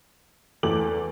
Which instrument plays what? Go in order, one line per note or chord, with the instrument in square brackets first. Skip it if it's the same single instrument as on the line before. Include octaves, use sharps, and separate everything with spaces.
[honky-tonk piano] E2 D6 F#7 [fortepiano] A3